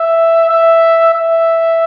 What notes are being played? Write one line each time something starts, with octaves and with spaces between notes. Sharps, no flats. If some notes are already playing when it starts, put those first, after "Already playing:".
Already playing: E5
E5
E5